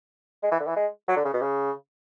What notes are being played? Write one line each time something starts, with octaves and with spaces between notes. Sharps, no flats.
G#3
E3
D3
E3
G#3
F#3
D3
C#3
B2
C#3